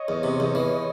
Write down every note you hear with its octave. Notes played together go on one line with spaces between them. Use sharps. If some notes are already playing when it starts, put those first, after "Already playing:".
Already playing: C#5 D#5
E2
C3
E2
E3